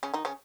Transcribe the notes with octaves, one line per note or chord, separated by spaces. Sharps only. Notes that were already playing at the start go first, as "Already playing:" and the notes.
C#3 C#4
D#3 D#4
C#3 C#4